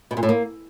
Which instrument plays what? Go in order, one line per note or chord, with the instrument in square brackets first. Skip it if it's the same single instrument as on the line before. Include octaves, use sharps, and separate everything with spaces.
[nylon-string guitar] B2
A#2
A2
A#3